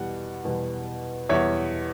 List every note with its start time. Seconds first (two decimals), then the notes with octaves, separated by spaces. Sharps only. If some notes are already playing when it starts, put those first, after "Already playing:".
Already playing: E2 B2 G3 F#5
0.45 E2 B2 G3
1.29 E2 B2 G3 C#5 E5